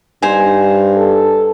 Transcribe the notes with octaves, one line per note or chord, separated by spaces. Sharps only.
G2 D#4 C5 G#5
A4